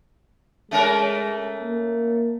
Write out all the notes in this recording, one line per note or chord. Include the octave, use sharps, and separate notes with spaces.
G#3 A3 C#4 A#4
A#3